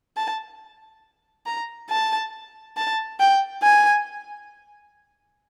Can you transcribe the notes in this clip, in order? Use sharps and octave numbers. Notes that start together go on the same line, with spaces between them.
A5
A#5
A5
A5
G5
G#5